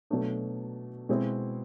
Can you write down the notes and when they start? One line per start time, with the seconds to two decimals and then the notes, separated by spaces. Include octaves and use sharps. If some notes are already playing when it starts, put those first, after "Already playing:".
0.10 B2 F#3 A3 D4
1.09 B2 G#3 C4 E4